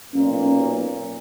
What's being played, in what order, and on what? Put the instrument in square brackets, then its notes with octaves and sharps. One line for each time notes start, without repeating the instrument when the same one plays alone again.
[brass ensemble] B1 A#2 A#3 [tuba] C#4